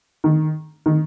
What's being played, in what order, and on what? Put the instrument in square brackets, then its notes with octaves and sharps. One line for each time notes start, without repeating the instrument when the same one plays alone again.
[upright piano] D#3
D#3